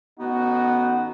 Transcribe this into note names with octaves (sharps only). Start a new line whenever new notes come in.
A1 B3 D#4 F#4